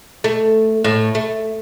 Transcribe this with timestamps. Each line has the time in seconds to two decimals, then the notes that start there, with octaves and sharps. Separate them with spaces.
0.24 A3
0.84 A2
1.15 A3